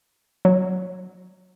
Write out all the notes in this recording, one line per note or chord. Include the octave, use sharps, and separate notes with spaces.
F#3